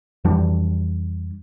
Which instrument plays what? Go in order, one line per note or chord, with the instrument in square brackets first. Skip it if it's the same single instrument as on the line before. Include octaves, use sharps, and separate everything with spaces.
[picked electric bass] F2 E3 G3 D4